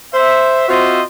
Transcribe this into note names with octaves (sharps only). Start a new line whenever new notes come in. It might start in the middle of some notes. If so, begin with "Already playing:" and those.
C5 E5
C4 F4 F#4 C5 D#5 E5